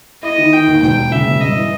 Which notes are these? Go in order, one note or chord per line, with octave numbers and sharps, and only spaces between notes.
E4 D#5
D#3
D#3 G5
D#2
E1 G5
E1
C#3 E5
E1
G2 D#5
E3